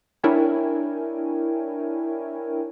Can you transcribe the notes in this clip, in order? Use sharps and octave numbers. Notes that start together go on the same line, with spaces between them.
D4 E4 A#4 C#5 G5 G#5